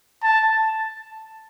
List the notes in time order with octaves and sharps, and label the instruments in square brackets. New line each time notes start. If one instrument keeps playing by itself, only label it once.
[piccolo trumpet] A5